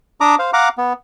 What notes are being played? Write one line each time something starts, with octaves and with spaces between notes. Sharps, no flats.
D4 A#5 D6 D#6
C5 F5
F5 F#5 A#5 D6
B3